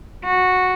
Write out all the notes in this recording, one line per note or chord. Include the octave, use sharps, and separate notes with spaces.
F#4